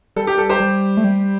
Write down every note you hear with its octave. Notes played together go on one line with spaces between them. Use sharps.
G3 A4
G4
A4
G4 C5
G3
A3
G3